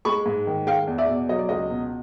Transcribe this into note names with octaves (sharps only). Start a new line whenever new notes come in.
G#3 B5 C#6
G#2
D#3
G#3 F5 G5
E2
D5 E5
B2
F#3 D#5
D5
C#2 D#5
B2